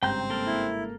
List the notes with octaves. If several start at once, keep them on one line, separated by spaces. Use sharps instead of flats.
G#1 G2 C#3 C4 G5 A#5 G6
A#3 A4 A#4
E4